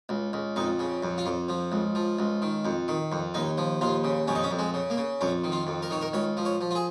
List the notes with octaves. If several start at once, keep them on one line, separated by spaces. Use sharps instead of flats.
C#2
C#2
F2 D#4
C#3
F2
F4
F2
F3
C#2
F3
C#2
D#3
F2
D#3
F2
D#2 D#4
F3
D#2 F4
C#3
F2 C#4
D#4
C#4
F2
G#3
C#3
A#3
C#3
F2 C#4
D#3
F4
F2
A#4
D#3 C#5
A#4
C#2 C#5
F3
C#5
F3
F4
G#4